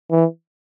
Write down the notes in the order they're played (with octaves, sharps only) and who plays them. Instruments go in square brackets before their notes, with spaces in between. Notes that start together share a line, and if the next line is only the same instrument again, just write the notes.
[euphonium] E3